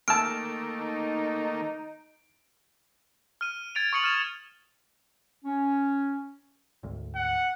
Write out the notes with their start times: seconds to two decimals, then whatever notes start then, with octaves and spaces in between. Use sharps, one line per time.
0.08 D#3 A3 A#3 A5 E6 F6 D7
0.76 D#4
3.41 F6 D#7
3.75 G#6 A6 D7 F7
3.93 C#6 D#6 C#7 F#7
4.04 F6 E7
5.45 C#4
6.83 G#1 D2
7.16 F#5